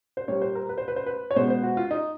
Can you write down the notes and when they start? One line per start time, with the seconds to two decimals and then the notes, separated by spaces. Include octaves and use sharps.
0.17 C5
0.28 A#2 G3 A#3 C#5
0.41 C5
0.55 A#4
0.69 B4
0.78 C5
0.88 B4
0.96 C5
1.06 B4
1.31 C#5
1.36 B2 G#3 B3 C5
1.50 C5
1.63 F#4
1.77 F4
1.91 D#4